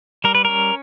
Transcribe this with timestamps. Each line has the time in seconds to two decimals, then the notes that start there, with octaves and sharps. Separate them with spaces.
0.24 G3 A#4
0.35 B4
0.45 C#4 A#4